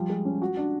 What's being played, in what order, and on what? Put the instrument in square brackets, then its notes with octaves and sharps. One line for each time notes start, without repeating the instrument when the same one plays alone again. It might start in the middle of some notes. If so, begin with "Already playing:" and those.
Already playing: [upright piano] F3 G3
G#3
C#4
F#4
D4